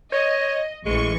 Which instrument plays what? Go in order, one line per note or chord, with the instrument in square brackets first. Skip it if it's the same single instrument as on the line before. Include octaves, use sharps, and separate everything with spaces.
[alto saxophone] C#5 [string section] D#5
[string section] A1 E3 C#6 [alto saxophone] G#3